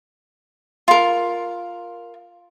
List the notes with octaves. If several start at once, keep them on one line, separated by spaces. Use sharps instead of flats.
F4 A#4